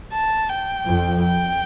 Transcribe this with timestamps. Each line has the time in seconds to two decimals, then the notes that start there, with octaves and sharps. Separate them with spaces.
0.13 A5
0.49 G5
0.86 F2
1.22 G5